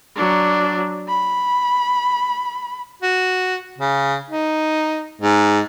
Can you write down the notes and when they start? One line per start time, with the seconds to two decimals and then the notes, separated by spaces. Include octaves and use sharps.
0.16 F#3 D4
1.08 B5
3.02 F#4
3.78 C#3
4.30 D#4
5.22 G#2